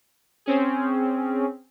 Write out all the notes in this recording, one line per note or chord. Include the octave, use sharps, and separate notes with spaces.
C4 C#4 G#4